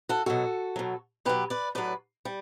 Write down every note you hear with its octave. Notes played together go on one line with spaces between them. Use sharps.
F#4 A4
B2 F#3 F#4 A4
B2 F#3
B2 F#3 G4 B4
B4 D5
A2 F#3 B4 D5
G3